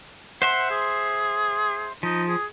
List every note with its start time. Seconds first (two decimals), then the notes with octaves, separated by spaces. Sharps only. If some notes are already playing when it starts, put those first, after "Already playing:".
0.42 C5 E5 F#5 C6
0.71 G#4
2.03 F3 D#4
2.28 G#4